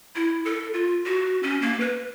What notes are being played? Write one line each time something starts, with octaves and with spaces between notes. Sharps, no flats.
E4
A4
F4
F#4
C#4
A#3
B4